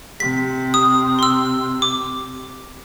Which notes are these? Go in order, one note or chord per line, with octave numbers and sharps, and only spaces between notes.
C3 B6
D#6
C6 E6
D6